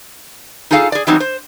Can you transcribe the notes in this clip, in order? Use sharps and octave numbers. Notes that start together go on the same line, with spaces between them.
D#4 F4 G#4 A4 F5
G#4 D5
E3 F#3 G3 B3 C4 D#4
C5